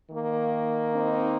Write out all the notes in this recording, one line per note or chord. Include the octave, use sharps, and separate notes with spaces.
D#3 A#3
C4 D#4